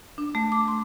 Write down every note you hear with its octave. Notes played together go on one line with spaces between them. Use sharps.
D4
A3
D6
C6